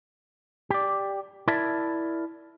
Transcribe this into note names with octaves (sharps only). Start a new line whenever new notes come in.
G4 D5
E4 A#4 D5 E5 A5